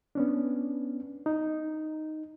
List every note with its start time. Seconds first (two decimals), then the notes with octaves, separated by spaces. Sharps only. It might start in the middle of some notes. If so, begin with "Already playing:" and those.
0.15 B3 C#4 D4
1.26 D#4